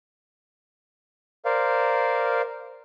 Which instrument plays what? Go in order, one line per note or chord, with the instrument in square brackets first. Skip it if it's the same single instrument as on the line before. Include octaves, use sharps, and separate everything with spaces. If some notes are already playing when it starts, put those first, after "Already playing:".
[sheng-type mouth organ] A#4 C5 D5 F5